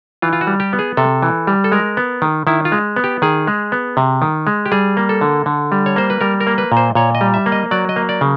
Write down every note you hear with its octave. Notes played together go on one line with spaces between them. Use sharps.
E3 F4
F4
F#4
G3
G4
B3
G#4
C3 A4
E3
G3
A4
G#3 A#4
B3
D#3
D#3 E4
F4
G#3
B3
G4
D#3 G#4
G#3
B3
C3
D#3
G#3
G4
G3 G#4
A#3
A4
D3
D3
G3
C#5
A#3 C5
B4
G3 A#4
A#4
A#3
B4
A#2
C5
A#2 C#5
D#5
G3
E5
A#3
D#5
F#3 D5
D#5
A#3
D5
C#3